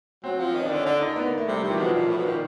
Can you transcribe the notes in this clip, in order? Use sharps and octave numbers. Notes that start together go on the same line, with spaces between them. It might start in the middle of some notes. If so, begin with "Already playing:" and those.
F#3 C4
F3
D#3 C#4
D3 D4
C#4
D3 D4
D#4
B3
A#3
A3
C3 G3
C3 D#3
E3
B2 F3
A#2
A2
B2
A#2 D#3